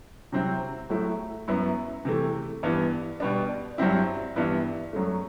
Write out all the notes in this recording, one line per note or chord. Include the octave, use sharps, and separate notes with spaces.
C3 F#3 C4 E4
A2 F#3 A3 E4
F#2 F#3 B3 E4
C3 E3 A3
G2 E3 B3
B2 G3 B3 D4
G2 F#3 C4 E4
G2 E3 B3 E4
F#2 F#3 A3